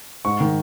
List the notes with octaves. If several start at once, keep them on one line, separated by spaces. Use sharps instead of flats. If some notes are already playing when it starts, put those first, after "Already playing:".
G#2 C#6
D#3